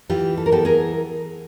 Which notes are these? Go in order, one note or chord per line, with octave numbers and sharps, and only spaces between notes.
E3 F4 G4
A4
A#4
B3 G4 A4
G#4 A#4